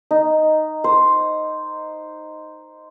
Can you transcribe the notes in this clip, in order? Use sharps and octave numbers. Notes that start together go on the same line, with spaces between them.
D#4
C5